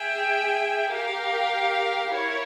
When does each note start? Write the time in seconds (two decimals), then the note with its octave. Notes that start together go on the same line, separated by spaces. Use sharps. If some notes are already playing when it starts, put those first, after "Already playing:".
Already playing: G#4 E5 G5
0.90 G4 A#4 F5
2.12 E4 A#4 C#5